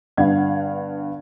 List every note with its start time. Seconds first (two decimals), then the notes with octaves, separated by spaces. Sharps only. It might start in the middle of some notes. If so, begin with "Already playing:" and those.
0.17 G2 D3 B3 F5 F#5 G#6